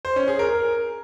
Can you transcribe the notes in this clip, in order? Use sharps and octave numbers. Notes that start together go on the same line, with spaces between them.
C5
C#4
G#4
A#4